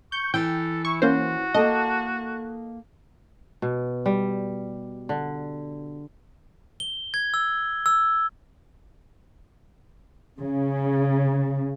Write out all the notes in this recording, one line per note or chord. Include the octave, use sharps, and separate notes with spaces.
C#6 G6
E3 A4 G5
E4 C#6
A#3 C#4 F#4 C5
A#3 A4 D#5 A5
B2
G3
D3
G7
G#6
E6
E6
C#3